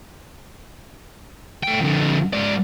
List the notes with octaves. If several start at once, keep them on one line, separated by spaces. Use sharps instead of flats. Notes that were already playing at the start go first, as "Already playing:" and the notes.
A3 G5
F2 D3
G#2 D5